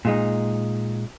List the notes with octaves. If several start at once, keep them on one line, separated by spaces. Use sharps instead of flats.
A#2 G#3 D#4